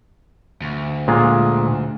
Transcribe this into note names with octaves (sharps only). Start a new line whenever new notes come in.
D2
A#2 G#3 F4